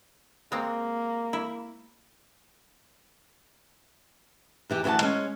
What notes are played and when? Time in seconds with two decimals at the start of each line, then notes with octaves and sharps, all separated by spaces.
0.52 G#3 A#3 C4
1.33 E4
4.70 E2 E3 G4
4.84 D2 E3 C#5 F#5 A5
5.01 G#3 C#4